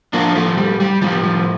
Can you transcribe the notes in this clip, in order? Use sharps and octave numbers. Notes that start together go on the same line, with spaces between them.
A2 F3 A#3 D4
F3 A3
G3
G3
A2 F3 G3
F3